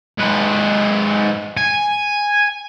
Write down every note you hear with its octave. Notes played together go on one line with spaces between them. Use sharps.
G#2 B4
G#5